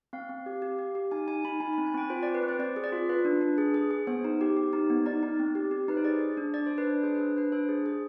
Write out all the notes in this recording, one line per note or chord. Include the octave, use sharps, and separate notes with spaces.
C4 F5
C4
G4
G4
G4
G4
D#4 G#5
D#4 G#5
D#4 B5
D#4 G#5
C4 B5
G#5
C4 G5
F4 C5
C4 D5
B4
C4
C5
C4 D5
G#4
D5
F4
F4 B4
D4
D4
G#4
G#4
G#4
B3 C5
D#4
G4
G4
D#4
B3
D#4 D5
D#4
C4
G4
G4
D#4 B4
C5
G#4 D5
G#4
D4
D4 D5
D4 C5
B4
D4 C5
G#4 C5
B4
D4
D4 B4
D4 C5
G#4
G#4